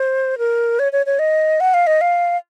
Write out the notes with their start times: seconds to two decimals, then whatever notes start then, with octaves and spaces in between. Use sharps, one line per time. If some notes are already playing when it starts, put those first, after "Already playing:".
Already playing: C5
0.38 A#4
0.79 C#5
0.93 C#5
1.06 C#5
1.19 D#5
1.60 F#5
1.74 F5
1.87 D#5
2.01 F5